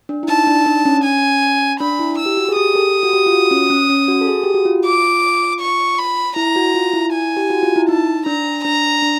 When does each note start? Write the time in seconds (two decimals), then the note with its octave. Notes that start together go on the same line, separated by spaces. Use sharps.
0.09 D4
0.23 E4
0.28 D#4 A5
0.47 D4
0.57 D#4
0.66 D4
0.85 C#4
1.04 G#5
1.80 D4 B5
1.99 E4
2.19 E6
2.26 G4
2.37 F#4
2.49 G#4
2.56 G4 D#6
2.75 G4 A4
3.03 F#4
3.13 G4
3.26 F4
3.32 F#4
3.51 C#4
3.70 C#4
3.90 C#4
4.08 F#4
4.21 A4
4.27 G#4
4.43 G4
4.54 F#4
4.65 F4
4.84 D6
5.61 C#6
5.98 B5
6.36 E4 A#5
6.56 F#4
6.74 F4
6.94 E4
7.13 G#5
7.37 G4
7.50 F#4
7.63 F4
7.76 E4
7.89 D#4 A5
8.26 D4 A#5
8.65 D4 A#5
9.02 D4